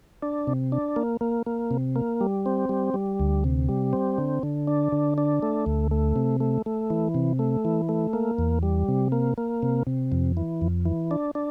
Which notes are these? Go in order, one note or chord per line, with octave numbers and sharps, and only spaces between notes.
D4
C3
D4
A#3
A#3
A#3
C3
A#3
G3
C4
G3
G3
D2
C3
G3
C4
D3
D3
D4
D3
D4
A3
D2
A3
C3
A3
A3
E3
C3
A3
E3
A3
A#3
E2
G3
C3
A#3
A#3
C3
C3
F2
E3
F2
E3
D4
D4